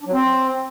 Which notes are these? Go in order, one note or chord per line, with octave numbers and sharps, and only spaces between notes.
D4
F#3
C4